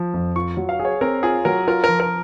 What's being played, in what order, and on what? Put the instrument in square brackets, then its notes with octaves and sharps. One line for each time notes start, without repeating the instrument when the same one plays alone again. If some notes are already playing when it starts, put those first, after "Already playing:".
Already playing: [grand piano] F3
F2
[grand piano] F4 [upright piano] C#6
[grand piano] F#3
[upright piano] F5
[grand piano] G#4
[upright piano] C#5
[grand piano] C4 [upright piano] A#4
[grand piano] F4 [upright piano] G#4
[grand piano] F#3 [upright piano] A#4
[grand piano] F4 [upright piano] A#4
[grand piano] F3 [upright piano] A#4
[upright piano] A#4